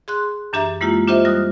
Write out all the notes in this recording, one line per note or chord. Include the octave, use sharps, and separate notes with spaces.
G#4 C6 F#6
F#2 E3 D4 G4 E5 A#5
G#3 A#3 E4 F4 G4
D4 F4 G4 C5 D#5 E5
G3 D#6 F6 F#6